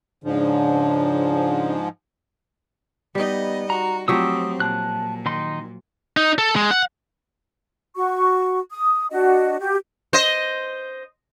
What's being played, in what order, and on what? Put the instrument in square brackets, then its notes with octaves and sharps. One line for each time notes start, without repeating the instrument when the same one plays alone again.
[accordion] G#2 F3 [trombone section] C#3 D4
[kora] G3 D#4 [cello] B3 D#5
[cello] F#4 [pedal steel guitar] A#5
[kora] F3 F#3 G4 [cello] A3 C4 [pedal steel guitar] D#6 E6
[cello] A#2 [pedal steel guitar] A5 F#6
[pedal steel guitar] D#3 D#4 C6
[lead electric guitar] D#4
A4
G#3
F#5
[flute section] F#4 C#6
D#6
D4 F#4 D#5
F#4 G4
[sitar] C5 D#5